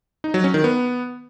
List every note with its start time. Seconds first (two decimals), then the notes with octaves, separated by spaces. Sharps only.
0.24 D#4
0.34 F#3
0.44 C#4
0.54 D#3
0.64 B3